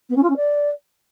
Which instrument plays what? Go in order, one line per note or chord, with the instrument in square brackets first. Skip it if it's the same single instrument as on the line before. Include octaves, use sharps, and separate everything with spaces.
[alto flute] B3
C#4
F4
C#4
D5